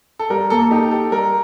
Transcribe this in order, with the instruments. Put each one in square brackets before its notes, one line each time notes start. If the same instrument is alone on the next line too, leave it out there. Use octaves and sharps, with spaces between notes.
[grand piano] A4
[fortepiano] G3 [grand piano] A#4
[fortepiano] A#3 [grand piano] A4
[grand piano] A4
[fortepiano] D#4 [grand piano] G4
[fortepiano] G4 [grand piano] A4
[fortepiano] G3 [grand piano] A#4